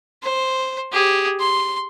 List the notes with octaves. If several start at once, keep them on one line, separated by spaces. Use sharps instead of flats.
C5
G4 G#4
C6